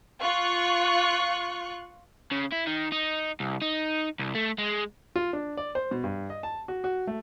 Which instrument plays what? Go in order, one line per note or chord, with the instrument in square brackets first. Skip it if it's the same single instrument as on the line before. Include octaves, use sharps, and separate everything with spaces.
[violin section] F4 C#6 F#6
[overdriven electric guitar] C#3
E4
D#3
D#4
C2
D#4
C2
A3
G#3
[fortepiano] F4
D4
D5
C5
B2
G2
D#5
A5
F#4
F#4
A3